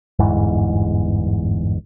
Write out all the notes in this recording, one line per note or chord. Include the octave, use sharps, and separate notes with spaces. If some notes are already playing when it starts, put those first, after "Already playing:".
G1 E2 G#2 E3